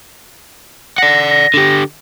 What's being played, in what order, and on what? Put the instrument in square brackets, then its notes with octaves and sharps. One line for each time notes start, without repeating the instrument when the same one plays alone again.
[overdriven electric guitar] D5 F#5 [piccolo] A#6
[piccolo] A#6
[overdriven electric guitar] D3 G4